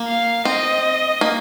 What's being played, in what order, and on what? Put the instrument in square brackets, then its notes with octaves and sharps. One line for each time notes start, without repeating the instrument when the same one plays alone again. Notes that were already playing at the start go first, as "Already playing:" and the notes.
Already playing: [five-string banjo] A#3
[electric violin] F5
[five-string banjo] C4 [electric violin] D#5
[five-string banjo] A#3